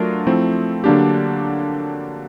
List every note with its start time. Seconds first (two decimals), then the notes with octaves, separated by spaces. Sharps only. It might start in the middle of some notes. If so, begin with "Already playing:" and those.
Already playing: F#3 A3 D4 F4 A#4
0.27 F3 A3 C4 E4
0.84 D3 F#3 A#3 D4 G4